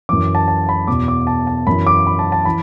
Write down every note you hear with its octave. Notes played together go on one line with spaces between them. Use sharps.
F#2 E3 D6
A5
A5
B5
E2 B2 D6
D6
A5
A5
F#2 E3 B5
D6
B5
A5
A5
E3 B5